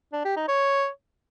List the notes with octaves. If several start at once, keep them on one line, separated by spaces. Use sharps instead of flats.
D4
G4
D#4
C#5